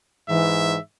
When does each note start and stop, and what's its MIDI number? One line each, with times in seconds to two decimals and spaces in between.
0.29 0.77 44
0.29 0.79 52
0.29 0.80 76